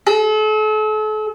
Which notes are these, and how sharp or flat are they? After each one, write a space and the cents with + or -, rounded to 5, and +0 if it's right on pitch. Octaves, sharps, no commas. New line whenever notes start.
A4 -40